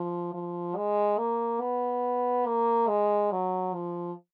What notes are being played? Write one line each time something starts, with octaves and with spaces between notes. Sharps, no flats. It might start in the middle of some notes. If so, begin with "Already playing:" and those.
Already playing: F3
F3
G#3
A#3
B3
A#3
G#3
F#3
F3